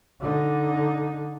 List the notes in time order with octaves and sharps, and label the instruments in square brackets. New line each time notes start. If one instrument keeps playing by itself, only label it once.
[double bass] D3 D#4